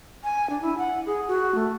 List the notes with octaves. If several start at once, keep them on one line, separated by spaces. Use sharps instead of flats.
G#5
D4
E4
F#5
G#4
F#4
A3